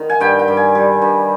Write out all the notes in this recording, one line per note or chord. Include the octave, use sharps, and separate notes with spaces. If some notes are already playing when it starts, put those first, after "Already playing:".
Already playing: D#3
G#5
G2 G5
G5
G2
G#5
G3
G2